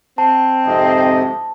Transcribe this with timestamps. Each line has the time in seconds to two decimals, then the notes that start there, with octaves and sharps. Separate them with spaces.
0.18 C4 A5
0.66 F2 G#2 C3 D#5